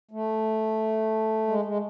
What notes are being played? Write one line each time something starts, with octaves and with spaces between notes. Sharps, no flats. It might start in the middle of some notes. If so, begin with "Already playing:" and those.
A3
G#3
G#3